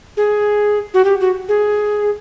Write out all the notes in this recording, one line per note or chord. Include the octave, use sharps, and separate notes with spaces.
G#4
F#4
G4
F#4
G#4